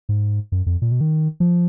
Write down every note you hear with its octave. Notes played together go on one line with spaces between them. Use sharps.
G#2
F#2
F2
A#2
B2
D#3
F3